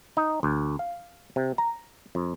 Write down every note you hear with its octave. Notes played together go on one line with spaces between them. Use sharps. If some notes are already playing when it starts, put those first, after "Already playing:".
D#4
D2
F5
C3
A#5
F2